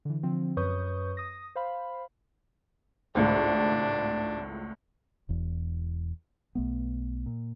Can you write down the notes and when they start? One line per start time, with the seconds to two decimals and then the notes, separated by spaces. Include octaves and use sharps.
0.05 D3 E3
0.23 D3 F3 C4
0.57 F#2 B4 C#5 C#6 D#6 G6
1.17 D#6 A#6
1.56 C5 F5 B5
3.15 G#1 C#2 A2 D4
5.29 E1 E2
6.55 B1 A3 B3
7.26 A#2